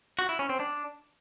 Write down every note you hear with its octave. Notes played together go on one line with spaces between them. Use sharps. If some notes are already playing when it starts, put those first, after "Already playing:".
F#4
E4
C#4
C4
D4